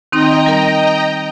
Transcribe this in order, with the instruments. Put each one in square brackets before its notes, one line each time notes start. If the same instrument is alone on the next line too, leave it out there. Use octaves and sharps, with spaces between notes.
[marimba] D#3 C4 D#4 [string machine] D#5 G5 A#5
[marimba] G3 A#4